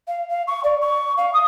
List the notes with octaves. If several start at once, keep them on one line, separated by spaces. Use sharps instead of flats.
F5
F5
C#6
D5
C#6
F5
D#6